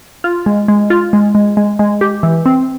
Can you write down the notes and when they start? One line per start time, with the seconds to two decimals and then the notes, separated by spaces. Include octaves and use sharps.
0.24 F4
0.46 G#3
0.68 G#3
0.90 F4
1.13 G#3
1.35 G#3
1.57 G#3
1.79 G#3
2.01 G4
2.23 E3
2.46 C4